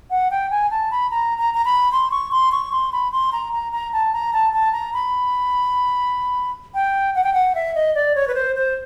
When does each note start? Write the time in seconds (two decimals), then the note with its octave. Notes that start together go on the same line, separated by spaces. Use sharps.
0.10 F#5
0.31 G5
0.51 G#5
0.71 A5
0.91 B5
1.11 A#5
1.38 A#5
1.54 A#5
1.65 B5
1.92 C6
2.11 C#6
2.31 C6
2.52 C#6
2.72 C6
2.93 B5
3.12 C6
3.32 A#5
3.53 A#5
3.73 A#5
3.93 A5
4.13 A#5
4.33 A5
4.53 A5
4.73 A#5
4.94 B5
6.74 G5
7.15 F#5
7.24 G5
7.33 F#5
7.55 E5
7.75 D#5
7.95 D5
8.15 C#5
8.28 B4
8.35 C5
8.56 C5